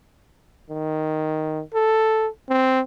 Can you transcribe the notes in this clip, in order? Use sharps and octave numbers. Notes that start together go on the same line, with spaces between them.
D#3
A4
C4